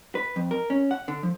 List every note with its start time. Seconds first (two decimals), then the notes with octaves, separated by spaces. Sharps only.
0.15 B4
0.36 F2
0.51 A#4
0.70 C#4
0.91 F#5
1.08 D3
1.23 F3